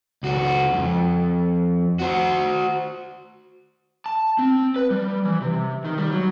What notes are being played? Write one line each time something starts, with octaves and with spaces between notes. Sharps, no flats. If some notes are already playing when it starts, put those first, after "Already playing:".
C#2 F#4
F2
F#4 C5
A5
C4
B4
G3
E3
C3
D#3
G3
F#3